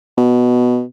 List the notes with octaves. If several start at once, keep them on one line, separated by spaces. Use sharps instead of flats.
B2